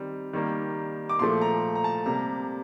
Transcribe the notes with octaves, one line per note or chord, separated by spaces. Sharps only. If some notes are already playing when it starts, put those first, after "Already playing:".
Already playing: D#3 G3 C4
D#3 G3 A#3
D6
A#2 F3 A3 C6
A#5
A#5
A5
C3 G3 A#3 A#5